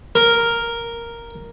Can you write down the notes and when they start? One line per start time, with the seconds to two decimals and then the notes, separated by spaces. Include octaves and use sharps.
0.15 A#4